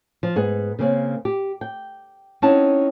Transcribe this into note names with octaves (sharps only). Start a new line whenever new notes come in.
F3
G#2 B3 G#4 F#5
C#3 A#3 C4 C#4
G4
G5
C4 C#4 D#4 E4 F#5 A5